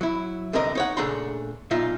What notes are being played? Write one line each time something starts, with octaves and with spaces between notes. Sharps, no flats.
F#3 E4
C2 D3 E3 C4 A#4 D#5
D#4 C#5 F#5
A#2 C#3 A3 D4 A#5 C6
B1 A#2 D#4 F4 E5